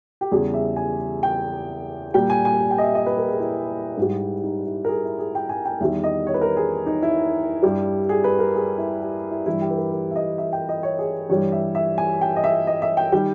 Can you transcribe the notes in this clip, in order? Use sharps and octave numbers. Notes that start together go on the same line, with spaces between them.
G4
E2 C#3 G3 G#4
E5
G#5
G5
A#2 G3 G5
G#5
G#5
G5
D#5
E5
D#5
B4
A#4
G#4
E4
G#2 G3
D#4
E4
A#4
G#4
E4
G#4
G5
G#5
G5
E2 D#3 G3 E5
D#5
C#5
B4
A#4
G#4
D#4
E4
G2 G3
G#4
B4
A#4
G#4
E4
G4
E4
G2 E3 G3 E4
G4
B4
A#4
B4
E5
D#5
E5
G5
D#5
C#5
G#4
G2 E3 G3 C#5
E5
E5
G#5
G5
D#5
E5
D#5
E5
G5
D#3 G3 G5